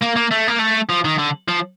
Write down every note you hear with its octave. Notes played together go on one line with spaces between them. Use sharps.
A#3
A#3
A3
A#3
A3
F3
D#3
D3
F3